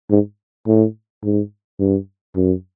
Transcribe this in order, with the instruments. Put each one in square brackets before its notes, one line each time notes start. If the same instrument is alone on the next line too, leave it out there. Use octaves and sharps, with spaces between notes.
[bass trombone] G#2
A2
G#2
G2
F#2